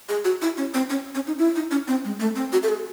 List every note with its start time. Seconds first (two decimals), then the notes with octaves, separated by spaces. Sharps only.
0.09 G#4
0.25 F#4
0.42 E4
0.57 C#4
0.74 C4
0.90 C#4
1.15 C#4
1.27 D#4
1.39 E4
1.55 D#4
1.71 C#4
1.88 C4
2.04 G#3
2.20 A3
2.36 C4
2.53 F#4
2.63 A4
2.69 G#4